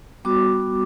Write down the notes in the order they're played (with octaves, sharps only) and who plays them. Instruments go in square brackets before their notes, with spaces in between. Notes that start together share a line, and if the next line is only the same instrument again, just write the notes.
[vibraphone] G3 B3 F#4 D6